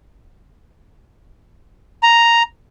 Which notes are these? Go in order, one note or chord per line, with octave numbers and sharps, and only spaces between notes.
A#5